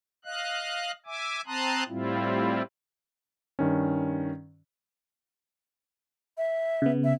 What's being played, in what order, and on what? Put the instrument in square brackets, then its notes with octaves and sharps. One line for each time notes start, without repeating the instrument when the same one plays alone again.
[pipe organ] D#5 F5 F#6
E5 G#5 D6
C4 A5 A#5 C6 D#6 F#6
A2 G3 C4 E4 F4
[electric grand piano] G2 D#3 C#4
[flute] E5
[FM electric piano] C#3 B3
[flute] E5